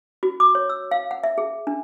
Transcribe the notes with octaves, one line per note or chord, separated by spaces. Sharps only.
F#4
D6
C#5
E6
F5
F#5
E5
G#4
D4